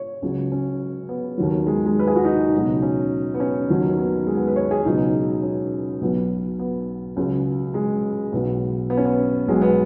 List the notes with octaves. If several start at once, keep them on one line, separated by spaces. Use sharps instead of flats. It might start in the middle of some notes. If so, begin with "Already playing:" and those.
Already playing: C#5
C#2 C#3 F#3
C#4
B3
D#2 D#3 F#3
G#3
G#3
B4
G#4
F#4
D#4
C#2 B2 F#3
C#4
B3
C#4
D#2 D#3 F#3
B3
G#3
B3
B4
C#5
G#4
C#2 B2 F#3 D#4
C#4
B1 B2 F#3 B3
B3
C#2 C#3 F#3
G#3
B1 B2 F#3 B3
B3
C#4
B3
B1 B2 F#3 G#3
B3